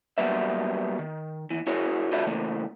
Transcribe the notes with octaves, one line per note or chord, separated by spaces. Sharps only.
F#3 G3 A#3 B3 B4 E5
D#3
D#2 E3
E4 F#4 G#4 A#4 C#5
F4 F#4 A4 B4 D5 E5
C#3 E3 A3 A#3